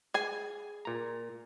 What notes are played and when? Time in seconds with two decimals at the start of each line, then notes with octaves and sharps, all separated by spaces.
0.14 G#4 G#5
0.85 A#2 A#5